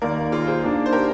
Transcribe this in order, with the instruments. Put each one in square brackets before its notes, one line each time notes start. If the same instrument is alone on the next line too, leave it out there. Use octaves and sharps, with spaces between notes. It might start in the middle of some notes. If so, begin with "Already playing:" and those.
[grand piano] D#2 D#3 A#3 [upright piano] A#4 D5
[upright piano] F4 G#4
G#4 C5
[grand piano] D#3 A#3 D4
[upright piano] C5
G4 A#4